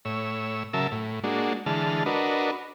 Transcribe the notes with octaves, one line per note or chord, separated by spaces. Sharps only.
A2 C#5 E6
C#3 F#3 A#4 E5 A5 E6
A2
G#3 A#3 D4 F#4
D3 E3 G#3 A5 F6
D4 F#4 A#4 B4 D#5